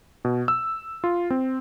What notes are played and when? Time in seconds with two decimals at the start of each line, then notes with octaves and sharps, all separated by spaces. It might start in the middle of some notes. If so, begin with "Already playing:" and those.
0.25 B2
0.48 E6
1.04 F4
1.30 C4